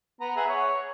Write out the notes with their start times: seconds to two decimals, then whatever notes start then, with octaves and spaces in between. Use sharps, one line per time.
0.20 B3 A#5
0.36 G#4 E5 F#5
0.49 C#5